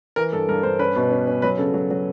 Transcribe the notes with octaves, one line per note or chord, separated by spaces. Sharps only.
E3 A#4
G2 A4
G2 A#4
G2 C5
C#4 B4
B2
C#4
C#4
F#3 B4
C#3 A4
F#3
F#3